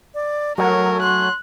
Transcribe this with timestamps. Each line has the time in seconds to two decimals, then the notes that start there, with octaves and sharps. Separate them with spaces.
0.14 D5
0.58 F#3 A3 A#4 F#5 G#5
1.02 C6 F#6